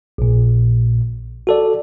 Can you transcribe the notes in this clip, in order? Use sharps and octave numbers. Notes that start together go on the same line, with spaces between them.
A#1 A#2
F#4 A4 D5